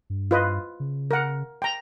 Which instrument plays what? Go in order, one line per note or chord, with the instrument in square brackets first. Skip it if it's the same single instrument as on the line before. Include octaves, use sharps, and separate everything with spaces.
[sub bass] G2
[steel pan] F4 B4 D#5
[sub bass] C#3
[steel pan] A#4 F#5
G5 A#5